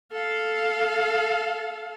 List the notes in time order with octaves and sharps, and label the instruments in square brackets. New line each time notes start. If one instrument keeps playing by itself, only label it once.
[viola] A4 F5